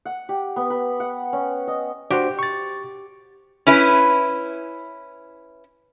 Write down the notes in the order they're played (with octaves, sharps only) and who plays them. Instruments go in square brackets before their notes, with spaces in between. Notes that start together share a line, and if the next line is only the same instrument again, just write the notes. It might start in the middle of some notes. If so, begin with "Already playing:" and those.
[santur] F#5
G4
B3
B4
F#5
C#4
D#5
[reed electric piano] D4 F#4 C5 [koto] G4
[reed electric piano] C#6 A6
[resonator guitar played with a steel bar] C#4 E4 B4